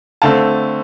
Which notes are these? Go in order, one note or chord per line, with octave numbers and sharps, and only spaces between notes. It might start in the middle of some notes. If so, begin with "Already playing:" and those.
D3 A3 C4 F5 A5